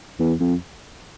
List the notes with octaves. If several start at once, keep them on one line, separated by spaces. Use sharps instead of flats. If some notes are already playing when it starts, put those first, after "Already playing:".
E2
F2